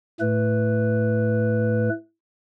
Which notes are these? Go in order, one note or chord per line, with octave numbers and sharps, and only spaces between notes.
A2 A3 B4